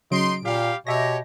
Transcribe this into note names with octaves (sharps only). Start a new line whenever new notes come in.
C#3 F#3 D#4 C6 D7
A#2 G3 G4 F5
B2 G4 C#5 E5 A#6